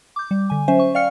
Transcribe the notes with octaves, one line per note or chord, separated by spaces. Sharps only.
D6 G6
G3
D3 G#5
F#3 C#4 C5 E5 G#5
C#6
D5 F5 G5 F6 C#7